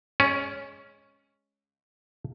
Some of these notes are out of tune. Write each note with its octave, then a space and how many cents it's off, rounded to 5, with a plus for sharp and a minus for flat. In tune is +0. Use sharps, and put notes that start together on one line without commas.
G#3 +0 C#4 +0 D5 -45